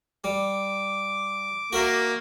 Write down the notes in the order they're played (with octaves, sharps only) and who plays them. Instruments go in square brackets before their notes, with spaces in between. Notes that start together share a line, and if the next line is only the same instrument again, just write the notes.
[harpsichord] G3 [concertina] D6
[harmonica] A#3 [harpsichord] F#4 A#4 E5